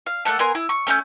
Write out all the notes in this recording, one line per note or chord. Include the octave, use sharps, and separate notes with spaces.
F5
A3 A#3 F#5 A5
B3 A#4 G#5 C6
E4
C#6
A3 C#4 C6 G6